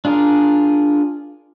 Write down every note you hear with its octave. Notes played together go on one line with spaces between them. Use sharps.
D4 F4 G#4 A#4